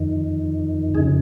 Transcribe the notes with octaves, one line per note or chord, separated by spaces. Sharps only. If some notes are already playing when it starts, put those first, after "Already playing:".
Already playing: F2 D#3
F2 C#3 D#4 G#4